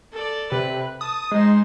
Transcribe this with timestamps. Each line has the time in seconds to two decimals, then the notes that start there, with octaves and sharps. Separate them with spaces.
0.12 A4 D5
0.52 C3 B4
1.01 A5 D#6
1.31 G#3 D#4 C5